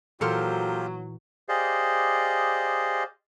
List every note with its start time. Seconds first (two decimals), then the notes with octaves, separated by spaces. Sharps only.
0.21 A#2 E3 F#3 F4 G4 A4 A#4 C5
1.49 G4 G#4 C5 D5 D#5 F5